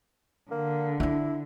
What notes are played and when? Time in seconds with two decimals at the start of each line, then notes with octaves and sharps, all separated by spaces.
0.51 D3 A#3
1.00 D4 E4 F4